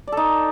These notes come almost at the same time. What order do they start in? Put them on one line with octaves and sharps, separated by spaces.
D5 A4 D#4